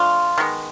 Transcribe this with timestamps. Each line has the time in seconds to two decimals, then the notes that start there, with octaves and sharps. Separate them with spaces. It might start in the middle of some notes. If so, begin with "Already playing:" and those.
Already playing: F3 A3 D4 F4
0.38 D#3 G#3 B3